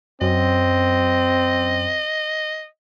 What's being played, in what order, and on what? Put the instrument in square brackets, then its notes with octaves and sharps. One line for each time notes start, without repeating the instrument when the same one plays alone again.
[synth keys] F#2 [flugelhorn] C4 [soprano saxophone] D#5